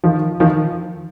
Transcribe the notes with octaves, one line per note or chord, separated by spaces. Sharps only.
D#3 F3
D#3 F3